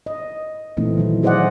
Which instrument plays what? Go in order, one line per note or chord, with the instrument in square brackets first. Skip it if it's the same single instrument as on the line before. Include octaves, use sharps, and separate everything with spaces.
[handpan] D#5
A#2 E3 A3 C4 D#4
D#3 F#3 E4
E4 G#4 C5 D5 D#5 F#5